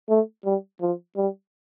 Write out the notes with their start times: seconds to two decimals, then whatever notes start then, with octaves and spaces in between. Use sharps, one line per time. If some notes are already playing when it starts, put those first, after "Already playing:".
0.10 A3
0.45 G3
0.82 F3
1.17 G3